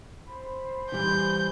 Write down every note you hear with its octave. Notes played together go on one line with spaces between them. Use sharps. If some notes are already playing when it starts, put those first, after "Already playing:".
C5 B5
E3 G3 G6